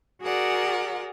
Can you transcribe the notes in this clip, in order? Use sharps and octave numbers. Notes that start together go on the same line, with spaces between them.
F#4 G#4 A#4 D5 F#5